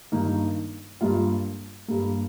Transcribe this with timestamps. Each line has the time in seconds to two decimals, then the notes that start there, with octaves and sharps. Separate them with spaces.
0.12 G2 D#3 A#3 D#4
1.01 G2 G3 A#3 F4
1.88 G2 G3 A#3